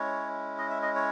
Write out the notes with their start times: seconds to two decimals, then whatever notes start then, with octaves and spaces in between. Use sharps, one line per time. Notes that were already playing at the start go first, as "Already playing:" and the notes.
Already playing: G#3 C#4 E4 C#5
0.58 D#5
0.70 E5
0.82 D#5
0.95 C#5